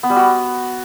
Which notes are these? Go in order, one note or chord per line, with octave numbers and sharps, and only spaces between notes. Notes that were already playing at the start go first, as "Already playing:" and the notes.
B3
G3
F#4